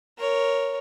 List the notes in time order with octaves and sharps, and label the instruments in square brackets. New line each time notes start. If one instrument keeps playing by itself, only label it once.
[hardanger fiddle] A#4 C#5